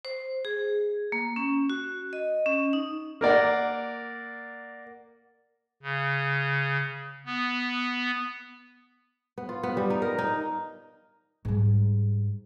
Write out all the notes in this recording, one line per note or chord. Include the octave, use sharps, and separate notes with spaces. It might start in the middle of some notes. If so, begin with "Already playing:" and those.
C5
G#4
A#3
C#4
F#4
D#5
C#4
D#4
A#3 A#4 D5 F#5
C#3
B3
B3
F4
B3
G3
D#4
A#4
D#4
G#2 G3